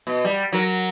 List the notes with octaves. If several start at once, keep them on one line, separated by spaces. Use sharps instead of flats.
B2
G3
F#3 A#4